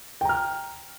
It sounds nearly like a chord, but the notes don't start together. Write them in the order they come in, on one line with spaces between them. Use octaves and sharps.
G5 A#5 F6